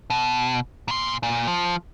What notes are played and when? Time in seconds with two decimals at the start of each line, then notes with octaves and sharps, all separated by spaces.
0.10 B2
0.88 A#2 C6
1.23 A#2
1.47 F3